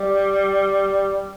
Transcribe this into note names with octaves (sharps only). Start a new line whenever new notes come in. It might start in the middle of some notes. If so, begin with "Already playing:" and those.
Already playing: G3